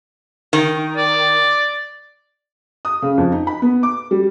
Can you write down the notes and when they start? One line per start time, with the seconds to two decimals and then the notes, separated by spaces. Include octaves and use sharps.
0.53 D#3
0.97 D5
2.85 D#6
3.02 C#3
3.18 F2
3.32 D#4
3.47 B5
3.62 B3
3.83 D6
4.11 G3